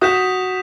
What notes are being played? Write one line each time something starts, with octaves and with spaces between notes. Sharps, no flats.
F#4 D#6 G6 B6 E7